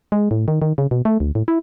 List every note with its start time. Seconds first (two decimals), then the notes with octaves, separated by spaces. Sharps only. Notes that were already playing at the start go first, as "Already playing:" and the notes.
0.12 G#3
0.31 A2
0.48 D#3
0.62 D#3
0.78 C#3
0.91 B2
1.05 A3
1.20 D2
1.35 A2
1.48 E4